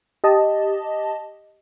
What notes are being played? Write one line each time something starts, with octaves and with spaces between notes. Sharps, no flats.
G4 D#5 A5